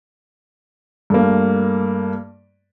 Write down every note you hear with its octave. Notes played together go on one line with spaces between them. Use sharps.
G2 A3 A#3